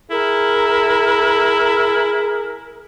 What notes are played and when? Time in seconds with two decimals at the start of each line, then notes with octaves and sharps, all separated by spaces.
0.11 E4 G#4 A#4